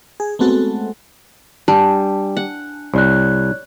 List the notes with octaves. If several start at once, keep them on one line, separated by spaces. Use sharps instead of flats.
G#4
G#3 A3 B3 C4 F#4 A4
G3 D4 A5
F#5
C2 C#5 D5 F#6